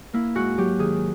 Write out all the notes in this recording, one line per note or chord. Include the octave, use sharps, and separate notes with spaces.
A#3 E4
G#2 F#4
F#3 G4
D#3 G#4